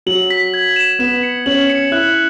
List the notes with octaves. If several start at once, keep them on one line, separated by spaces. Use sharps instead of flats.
F#3 F#7
B6
G#6
E7
B3 E7
C#7
C#4 F#7
C#7
E4 F#6